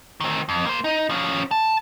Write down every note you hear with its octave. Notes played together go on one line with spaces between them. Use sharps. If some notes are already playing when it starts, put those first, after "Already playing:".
D#3 C4
F2
A#3 C5
D#4
F3 C#4
A5